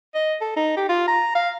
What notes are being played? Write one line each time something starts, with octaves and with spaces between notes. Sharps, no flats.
D#5
A4
D#4
G4
F4
A#5
F5